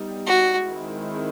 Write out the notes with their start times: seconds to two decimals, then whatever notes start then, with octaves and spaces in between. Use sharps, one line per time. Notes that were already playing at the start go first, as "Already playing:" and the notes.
Already playing: G3 B3 D#4
0.26 F#4
0.68 D#3 G#3 C4 E4